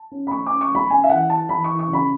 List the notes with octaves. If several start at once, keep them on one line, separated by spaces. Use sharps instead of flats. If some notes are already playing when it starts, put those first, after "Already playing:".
Already playing: A5
C#4
B5
A3 C#6
C#4 D6
C#6
A3 B5
C#4 G#5
E5
E3 F#5
E3 A5
E3 B5
E3 C#6
C#6
C#3
B5